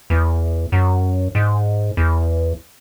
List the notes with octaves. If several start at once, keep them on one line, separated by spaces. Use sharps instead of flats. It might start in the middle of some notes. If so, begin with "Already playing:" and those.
E2
F#2
G#2
E2